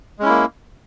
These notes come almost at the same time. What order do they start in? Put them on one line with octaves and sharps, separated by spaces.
G#3 C#4 E4 A#3